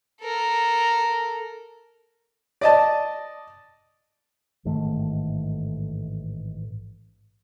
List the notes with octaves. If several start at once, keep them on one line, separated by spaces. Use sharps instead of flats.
A4 A#4
D5 D#5 A5
A1 G#2 D#3 A3